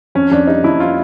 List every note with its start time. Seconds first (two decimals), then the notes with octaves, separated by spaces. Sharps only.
0.15 F2 C#4
0.31 F2 D4
0.47 G3 D#4
0.64 F2 E4
0.80 F4